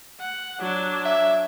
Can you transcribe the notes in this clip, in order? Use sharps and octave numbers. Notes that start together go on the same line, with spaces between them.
F#5
F#3 D4
E5